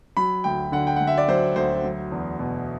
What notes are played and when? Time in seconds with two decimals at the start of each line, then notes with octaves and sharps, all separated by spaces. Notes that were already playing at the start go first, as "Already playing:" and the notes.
0.17 F#3 B5
0.44 D2 G5
0.72 D3 F#5
0.87 G5
0.96 D2 F#5
1.07 E5
1.18 D5
1.28 F#3 C5
1.56 D2 C5
1.84 F#3
2.12 E2
2.39 B2